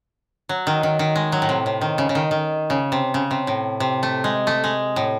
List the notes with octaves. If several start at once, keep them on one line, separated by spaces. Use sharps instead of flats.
F#3
D#3
D#3
D#3
G#3
F#3
A2
C3
C3
D#3
C#3
C#3
D#3
D#3
C#3
C3
C#3
C3
A2
C3
A3
G#3
A3
G#3
A2